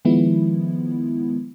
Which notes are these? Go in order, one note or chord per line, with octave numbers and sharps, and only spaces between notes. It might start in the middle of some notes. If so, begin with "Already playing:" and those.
D#3 F3 G#3 B3 E4